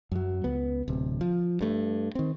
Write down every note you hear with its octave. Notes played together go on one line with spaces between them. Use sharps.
F#2 F#3
C#2 B3
D1 C3
F3
G2 A3
D#3 C4